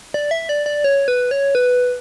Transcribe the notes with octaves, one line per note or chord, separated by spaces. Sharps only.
D5
E5
D5
D5
C#5
B4
C#5
B4